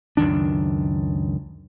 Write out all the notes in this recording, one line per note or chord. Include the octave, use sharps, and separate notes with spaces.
C#2 F#2 D#3 D4